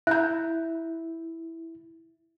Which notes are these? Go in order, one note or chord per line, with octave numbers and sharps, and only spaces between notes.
E4 E5 A#5 F#6 G6